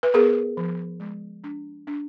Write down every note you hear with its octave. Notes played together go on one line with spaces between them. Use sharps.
B4
B3 G#4 A#4
F3
G#3
D4
D4